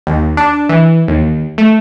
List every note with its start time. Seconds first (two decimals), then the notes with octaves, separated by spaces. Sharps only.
0.07 D#2
0.37 D4
0.69 E3
1.08 D#2
1.58 A3